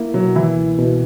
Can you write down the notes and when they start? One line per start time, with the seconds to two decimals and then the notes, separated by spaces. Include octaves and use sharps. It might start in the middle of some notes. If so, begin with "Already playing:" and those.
Already playing: A#3 E4
0.14 B2 F#3
0.36 E3 E4
0.56 C#2
0.79 B2